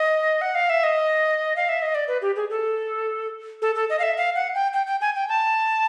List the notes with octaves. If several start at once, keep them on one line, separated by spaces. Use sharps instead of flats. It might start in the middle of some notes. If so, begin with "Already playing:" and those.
Already playing: D#5
F#5
F5
E5
D#5
F5
E5
D#5
D5
B4
G4
G#4
A4
A4
A4
D#5
F5
E5
F5
F#5
G5
G5
G5
G#5
G5
A5